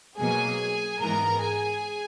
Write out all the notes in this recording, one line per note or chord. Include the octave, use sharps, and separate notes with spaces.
B2 F#3 A#3 G#4 G#5
G#2 E3 B3 A#4 A#5
G#4 G#5